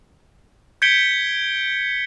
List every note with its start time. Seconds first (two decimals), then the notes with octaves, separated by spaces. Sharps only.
0.82 G6 G#6 B6 C#7 D7 G7